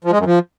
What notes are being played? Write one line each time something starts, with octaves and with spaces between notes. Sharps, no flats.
F3
G#3
F#2
F3